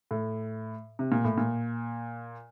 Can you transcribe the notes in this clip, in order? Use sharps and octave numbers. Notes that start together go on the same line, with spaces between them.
A2
C3
A#2
A2
A#2